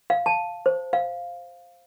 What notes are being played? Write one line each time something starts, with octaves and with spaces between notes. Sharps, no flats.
F5
A5
C5
F5